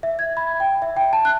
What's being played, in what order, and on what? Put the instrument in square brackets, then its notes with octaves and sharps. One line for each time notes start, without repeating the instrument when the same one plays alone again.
[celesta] E5
G#6
B5
G5
E5
G5
A5
F#6